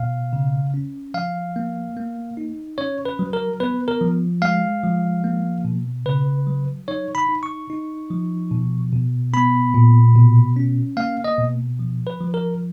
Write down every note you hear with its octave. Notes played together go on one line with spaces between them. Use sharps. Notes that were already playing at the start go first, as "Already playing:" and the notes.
Already playing: B2 F5
C#3
C#4
F3 F5
A#3
A#3
D#4
C#4 C#5
B4
F#3
A#4
B3 B4
A#4
F3
G#3 F5
F3
A#3
B2
C#3 B4
F#3
D#4 C#5
B5
D#4
C#6
D#4
F3
B2
B2
B3 B5
A#2
B2
C#4
A#3 F5
D#5
B2
F3
B4
F3
A#4